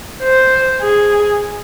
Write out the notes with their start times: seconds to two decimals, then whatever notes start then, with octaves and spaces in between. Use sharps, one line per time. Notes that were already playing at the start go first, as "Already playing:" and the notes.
0.23 C5
0.82 G#4